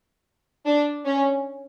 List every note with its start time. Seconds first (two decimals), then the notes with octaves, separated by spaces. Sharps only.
0.65 D4
1.06 C#4